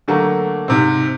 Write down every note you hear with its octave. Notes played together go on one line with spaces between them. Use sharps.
D3 F#3 A3 A#3
G#2 C3 C4